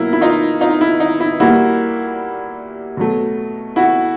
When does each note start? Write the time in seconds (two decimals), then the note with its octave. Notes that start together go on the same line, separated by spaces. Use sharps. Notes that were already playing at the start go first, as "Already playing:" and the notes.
Already playing: B2 F#3 A#3 E4
0.13 E4
0.21 D#4 F4
0.61 D#4 F4
0.81 E4
1.00 D#4
1.20 E4
1.40 A#2 G3 A#3 E4 F#4
2.97 B2 F#3 A3
3.76 E4 F#4